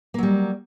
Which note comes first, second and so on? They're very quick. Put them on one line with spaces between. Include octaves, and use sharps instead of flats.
A#3 F#3 G3